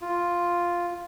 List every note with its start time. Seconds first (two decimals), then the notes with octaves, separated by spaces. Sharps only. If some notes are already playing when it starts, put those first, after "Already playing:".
0.01 F4